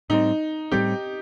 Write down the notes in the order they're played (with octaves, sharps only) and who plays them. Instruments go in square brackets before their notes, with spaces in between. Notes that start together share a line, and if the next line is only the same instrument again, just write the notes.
[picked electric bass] A2 G3 C4 [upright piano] D#4
[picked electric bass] A2 G3 C4 [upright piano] G4